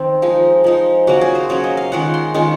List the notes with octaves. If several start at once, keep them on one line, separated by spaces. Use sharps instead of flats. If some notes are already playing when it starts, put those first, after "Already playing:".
Already playing: D#3 C4
F3 G#3 D#4
F3 G#3 D#4
C#3 F#3 A#3 C#4 F#4
G#4
C5
C#3 F#3 A#3 C#4 C#5
D#5
F5
D#3 G#3 C#4 F4 F#5
C6
D#3 G#3 C#4 F4 C#6